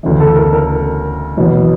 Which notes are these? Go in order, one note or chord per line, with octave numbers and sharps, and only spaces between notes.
D2 C#3 E3
A4
A#4
A#4
F#1 E2 B2 F#3 B3